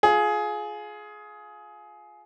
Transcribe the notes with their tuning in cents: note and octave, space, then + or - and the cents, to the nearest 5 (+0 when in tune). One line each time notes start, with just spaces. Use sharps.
F4 +10 G#4 +20